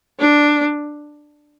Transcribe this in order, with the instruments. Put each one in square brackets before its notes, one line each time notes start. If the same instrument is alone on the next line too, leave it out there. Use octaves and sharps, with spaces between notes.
[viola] D4